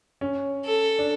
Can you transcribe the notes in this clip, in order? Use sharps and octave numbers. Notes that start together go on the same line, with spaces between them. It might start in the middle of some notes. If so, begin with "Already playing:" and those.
C#4
A4
D4